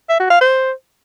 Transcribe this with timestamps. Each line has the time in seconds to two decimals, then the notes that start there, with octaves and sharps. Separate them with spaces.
0.09 E5
0.20 F#4
0.30 F5
0.41 C5